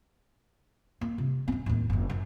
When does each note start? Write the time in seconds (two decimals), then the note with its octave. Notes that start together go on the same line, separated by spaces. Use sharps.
1.01 A#3
1.18 C3
1.48 B3 C#4
1.66 D#2 A2
1.90 F#1 F2
2.10 F#2